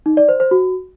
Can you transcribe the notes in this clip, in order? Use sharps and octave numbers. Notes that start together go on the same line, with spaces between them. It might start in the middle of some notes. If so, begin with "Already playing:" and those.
D#4
D5
C5
C5
F#4